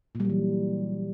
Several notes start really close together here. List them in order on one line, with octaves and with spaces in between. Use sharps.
A#2 G3 F#3 E3